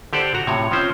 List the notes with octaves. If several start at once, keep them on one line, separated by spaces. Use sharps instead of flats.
D3 G4 A4 C5 D5
F#4 A#5
A2 C3 C#5
F3 C4 C#4 C5